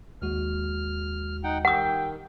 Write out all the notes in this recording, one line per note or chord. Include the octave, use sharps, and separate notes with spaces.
D#2 G#3 F#4 F6
D#4 F#5 G5
D#3 G4 F#5 G5 D#6 E6